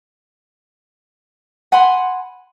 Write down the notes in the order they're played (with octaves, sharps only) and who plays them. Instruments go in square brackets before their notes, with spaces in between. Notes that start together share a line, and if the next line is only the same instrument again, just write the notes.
[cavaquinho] F#5 G#5 B5 C6